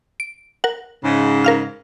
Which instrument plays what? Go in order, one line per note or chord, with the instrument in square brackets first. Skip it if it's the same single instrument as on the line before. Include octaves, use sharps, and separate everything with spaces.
[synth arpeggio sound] D7
A#4 F#5
[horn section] G#2 C#3
[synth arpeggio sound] A#4 F5 F6